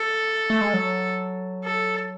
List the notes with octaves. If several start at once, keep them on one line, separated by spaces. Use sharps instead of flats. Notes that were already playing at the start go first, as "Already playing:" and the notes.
Already playing: A4
A3
G#3
F#3
A4